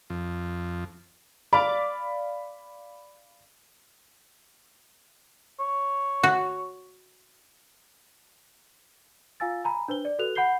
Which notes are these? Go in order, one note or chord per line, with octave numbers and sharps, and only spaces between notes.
F2
D5 F5 B5 D6
C#5
F#4
F4 F5 G#5 E6 A6
G#5 A#5 B5
D4 B4 C5 G7
D5
F#4 A4 B4 F#6 F7
F#5 B5 G6 C7 G7